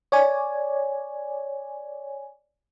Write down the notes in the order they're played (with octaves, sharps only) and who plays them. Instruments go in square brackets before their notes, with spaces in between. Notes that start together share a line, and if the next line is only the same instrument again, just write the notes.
[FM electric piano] C#5 D5 G#5